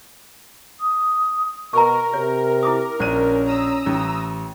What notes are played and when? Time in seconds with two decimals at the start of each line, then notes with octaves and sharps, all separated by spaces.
0.80 D#6
1.73 B2 A#4 A#5 C#6
2.14 C3 C#5
2.63 E4 D6 D#6
3.00 A#1 C#4 C5 D#7
3.46 A#5 D#6 E6
3.86 A1